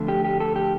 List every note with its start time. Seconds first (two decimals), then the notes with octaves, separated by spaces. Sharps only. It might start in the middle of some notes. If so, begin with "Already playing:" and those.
Already playing: F2 D3 A3
0.08 G4
0.25 G4
0.40 A4
0.56 G4